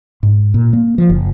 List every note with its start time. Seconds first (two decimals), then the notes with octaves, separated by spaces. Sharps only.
0.23 G#2
0.54 A#2
0.73 A#3
0.98 F3
1.09 F#1